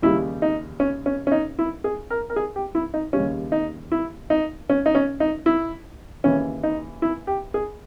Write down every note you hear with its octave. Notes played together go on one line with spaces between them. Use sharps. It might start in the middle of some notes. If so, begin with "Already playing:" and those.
D#2 C#3 G3 E4
D#4
C#4
C#4
C#4
D#4
E4
G#4
A#4
A#4
G#4
G4
E4
D#4
D#2 C#3 G3 C#4
D#4
E4
D#4
C#4
D#4
C#4
D#4
E4
D#2 C#3 E3 C#4
D#4
E4
G4
G#4